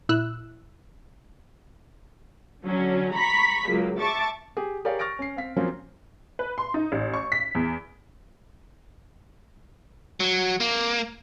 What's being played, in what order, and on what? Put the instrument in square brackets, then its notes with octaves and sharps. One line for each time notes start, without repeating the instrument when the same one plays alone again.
[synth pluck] A#2 E4 E6 F#6
[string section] D3 F#3 C#4
A#5 B5 C#6 B6
C#2 F#3 A#3
E5 A5 C#6 D6 A6
[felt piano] G4 G#4
G4 G#4 A#4 C#5 D5 F5
C#6 F6 A6 A#6 D7
C#4 C7
C4 F5 B6
F3 F#3 A#3 C4 C#4 F4
[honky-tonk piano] B4
C6
D#4
A1
C#6
B6
E2
[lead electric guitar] F#3
A#3